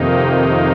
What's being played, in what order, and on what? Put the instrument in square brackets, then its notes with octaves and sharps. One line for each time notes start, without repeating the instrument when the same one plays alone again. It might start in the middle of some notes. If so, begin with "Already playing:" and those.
Already playing: [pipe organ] F2 C3 D#3 A#3 D#4